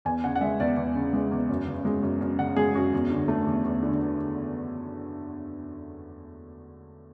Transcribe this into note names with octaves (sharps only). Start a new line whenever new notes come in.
E2 G#5
C#3 F#5
F#5
G#3 E5
E2 D5
E2
C#3
G#3
E2
F#2
C#3
G#3
F#2
F#2
C#3 F#5
G#3 G#4
F#2 F#4
E2
D3
A3
E2
E2
D3